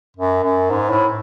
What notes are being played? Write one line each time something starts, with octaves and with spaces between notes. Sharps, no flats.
F#2
F#2
G#2
A2